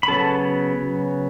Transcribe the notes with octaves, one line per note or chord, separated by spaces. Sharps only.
B5
C#3 F#3 B3 A4 A5